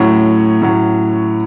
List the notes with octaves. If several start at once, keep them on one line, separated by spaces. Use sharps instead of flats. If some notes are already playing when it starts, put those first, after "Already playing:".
Already playing: A2 F#3 C#4
A2 F#3 C#4